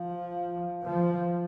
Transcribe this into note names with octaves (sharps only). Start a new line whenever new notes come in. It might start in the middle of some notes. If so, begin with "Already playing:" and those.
Already playing: F3
F3